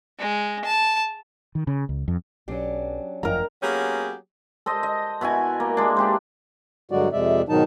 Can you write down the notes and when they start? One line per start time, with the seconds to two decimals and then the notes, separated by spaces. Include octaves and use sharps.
0.19 G#3
0.65 A5
1.55 D#3
1.67 C#3
1.89 C#2
2.08 F2
2.48 B1 F#3 C#4 D4 G4
3.23 G1 F#2 F3 A#4 A#5
3.63 F#3 A#3 B3 C#4 G4 G#4
4.66 A4 C5 D#5
4.83 D#5
5.21 B2 E4 F#4 G#5
5.60 A#3
5.77 G#3 D4
5.97 D4 G4 C5
6.91 G2 D3 F#3 G#3 F#4 D5
7.12 F2 C3 G#3 D5 E5
7.49 G#2 B2 D#3 F#3 D#4 A5